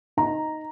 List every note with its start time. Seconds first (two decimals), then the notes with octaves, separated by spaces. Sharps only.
0.17 D#4 A#5